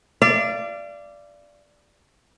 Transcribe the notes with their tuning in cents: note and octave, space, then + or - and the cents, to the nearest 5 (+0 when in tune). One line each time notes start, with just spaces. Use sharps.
D5 +0 F5 -40